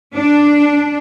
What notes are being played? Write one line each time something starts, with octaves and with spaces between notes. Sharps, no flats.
D4